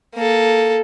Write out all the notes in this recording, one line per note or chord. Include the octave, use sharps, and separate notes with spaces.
A#3 A4